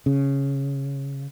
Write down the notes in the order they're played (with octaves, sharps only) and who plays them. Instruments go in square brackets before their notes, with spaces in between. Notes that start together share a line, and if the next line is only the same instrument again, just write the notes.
[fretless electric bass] C#3